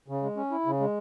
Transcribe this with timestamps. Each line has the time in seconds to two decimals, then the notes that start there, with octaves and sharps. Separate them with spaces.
0.08 C#3
0.22 G#3
0.37 C#4
0.51 E4
0.66 C#3
0.80 G#3